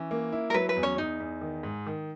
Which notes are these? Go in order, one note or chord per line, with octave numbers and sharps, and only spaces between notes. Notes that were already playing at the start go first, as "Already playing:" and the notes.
Already playing: E3 C#4
A#3
E4
A#4
F#3 B4
B4
E2
C#4 C#5
E2 D#4
E2
D#3
G#2
D#3